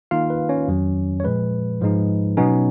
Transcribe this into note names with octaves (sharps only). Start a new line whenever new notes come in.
D#3 A#3 D#4 F4 F5
B4
C#4 C#5
F2 D#3 F#3
C#5
A#2 F3 G#3 B4
G#2 F3 G#3 D#4
B2 F#3 B3 C#4 D#4 C#5